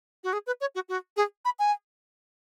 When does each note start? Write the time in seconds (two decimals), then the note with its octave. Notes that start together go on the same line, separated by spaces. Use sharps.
0.24 F#4
0.33 G#4
0.46 B4
0.61 C#5
0.75 F#4
0.89 F#4
1.17 G#4
1.45 B5
1.59 G#5